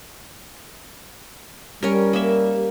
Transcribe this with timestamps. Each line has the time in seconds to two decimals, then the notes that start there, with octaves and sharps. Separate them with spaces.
1.83 G3 C#4 A#4
2.13 A#3 E5